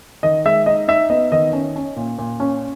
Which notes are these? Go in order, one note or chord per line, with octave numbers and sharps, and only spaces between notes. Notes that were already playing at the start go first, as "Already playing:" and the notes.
D#3 D#5
G#3 E5
D#4 D#5
D#4 E5
B3 D#5
D#3 D#5
C#4
C#4
A#2
A#2
C#4